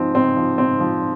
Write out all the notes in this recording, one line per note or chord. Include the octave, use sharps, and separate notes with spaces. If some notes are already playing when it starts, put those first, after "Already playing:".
Already playing: G#2 F3 C4
G#2 C4
F3
G#2 C4
F3